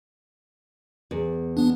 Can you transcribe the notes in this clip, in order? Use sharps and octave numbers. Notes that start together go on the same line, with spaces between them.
E2
B3 D4